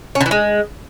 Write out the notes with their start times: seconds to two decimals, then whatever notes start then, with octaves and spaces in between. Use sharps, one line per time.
0.15 C#4
0.21 D3
0.26 E3
0.31 G#3